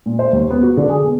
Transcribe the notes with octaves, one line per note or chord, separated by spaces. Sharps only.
A#2
C5
D#2
B3
F#4
D3
G#4
B3